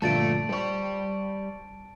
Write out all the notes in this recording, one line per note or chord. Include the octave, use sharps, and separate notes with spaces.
G1 A#2 F3 A3 A5 A6 D7
G3 C5 D5 C#6